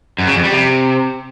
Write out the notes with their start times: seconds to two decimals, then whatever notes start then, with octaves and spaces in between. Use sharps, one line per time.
0.19 F#2
0.27 C#3
0.35 F2
0.44 G3
0.52 C3